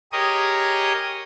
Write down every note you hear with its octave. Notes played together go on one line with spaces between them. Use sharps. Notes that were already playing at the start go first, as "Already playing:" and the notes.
G4 G#4 A#4 C#5 D#5 D#6